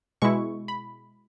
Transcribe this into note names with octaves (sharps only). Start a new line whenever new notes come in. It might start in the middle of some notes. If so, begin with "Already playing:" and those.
B2 G#3 E4 C#6
B5